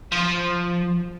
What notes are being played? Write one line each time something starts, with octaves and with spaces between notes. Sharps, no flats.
F3